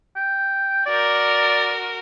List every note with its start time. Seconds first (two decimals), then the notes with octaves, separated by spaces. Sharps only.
0.16 G5
0.86 F#4 A#4 D5